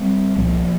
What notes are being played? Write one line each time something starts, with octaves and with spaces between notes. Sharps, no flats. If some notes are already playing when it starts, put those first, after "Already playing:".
Already playing: G3 C4
C2 A#2 F3 A#3